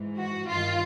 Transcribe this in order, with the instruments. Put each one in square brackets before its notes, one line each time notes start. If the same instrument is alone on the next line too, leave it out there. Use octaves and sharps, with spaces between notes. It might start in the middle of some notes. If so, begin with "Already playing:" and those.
Already playing: [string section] G#2 E3
F#4
G2 D#3 F4